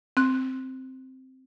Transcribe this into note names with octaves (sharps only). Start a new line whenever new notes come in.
C4 F#6